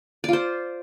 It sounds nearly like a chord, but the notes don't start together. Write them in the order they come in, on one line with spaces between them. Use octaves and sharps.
D5 F4 C5